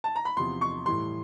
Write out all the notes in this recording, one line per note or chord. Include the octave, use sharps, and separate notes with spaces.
A5
A#5
B5
E2 C3 F3 C6
C#6
A2 E3 G3 C6